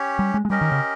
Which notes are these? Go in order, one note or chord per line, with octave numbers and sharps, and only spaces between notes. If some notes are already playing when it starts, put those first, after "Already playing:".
Already playing: C#4 G4 C#5
G3
G#3
G#3
G3 C#4 G4 A#4 D#5
D#3
C#3